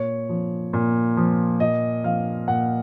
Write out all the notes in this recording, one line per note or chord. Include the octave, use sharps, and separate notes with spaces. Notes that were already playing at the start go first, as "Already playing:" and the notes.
Already playing: A#2 C#5
F3
A#2
F3
A#2 D#5
F3 F5
A#2 F#5